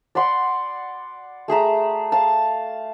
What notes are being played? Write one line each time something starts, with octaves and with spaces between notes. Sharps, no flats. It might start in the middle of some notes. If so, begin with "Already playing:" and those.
D5 F#5 B5 C6
A3 G#4 E5 A#5
F5 A5